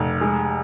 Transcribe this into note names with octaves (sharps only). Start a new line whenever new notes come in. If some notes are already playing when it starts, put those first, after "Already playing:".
Already playing: F1
G#3